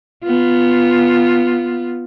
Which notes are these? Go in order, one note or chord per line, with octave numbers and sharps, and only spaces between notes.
B3 F4